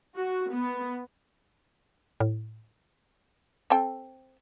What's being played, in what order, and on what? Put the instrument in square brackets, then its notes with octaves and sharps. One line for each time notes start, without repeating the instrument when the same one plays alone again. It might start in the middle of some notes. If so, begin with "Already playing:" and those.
[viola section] F#4
B3
[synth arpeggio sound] A2
[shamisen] C4 A4 G5